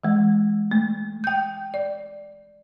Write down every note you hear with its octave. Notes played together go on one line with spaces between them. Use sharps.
E3 G#3
A3
G5 G6
D5